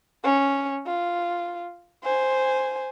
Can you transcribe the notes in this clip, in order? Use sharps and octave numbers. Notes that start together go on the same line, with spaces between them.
C#4
F4
C5 G#5